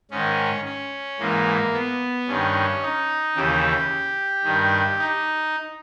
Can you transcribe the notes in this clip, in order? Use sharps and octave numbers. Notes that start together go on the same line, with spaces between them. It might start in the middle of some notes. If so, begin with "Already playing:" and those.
G#2 D#3 C#4
C#4
G#2 E3 A#3
B3
G2 D#3 C#4
D#4
D#2 C#3 E3 G4
G2 D#3
D#4